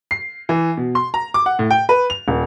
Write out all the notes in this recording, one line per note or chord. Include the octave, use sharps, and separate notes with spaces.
C7
E3
B2
C6
A#5
D6
F#5
A2
G5
B4
F7
D#1